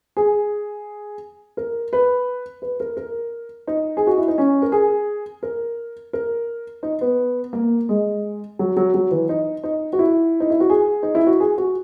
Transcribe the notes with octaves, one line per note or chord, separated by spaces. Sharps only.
G#4
A#4
B4
B4
A#4
A#4
D#4
G#4
F#4
E4
D#4
C#4
A#4
G#4
A#4
A#4
D#4
B3
A#3
G#3
F#3
F#3
F#3
E3
D#4
D#4
F#4
E4
D#4
E4
F#4
G#4
D#4
E4
F#4
G#4
F#4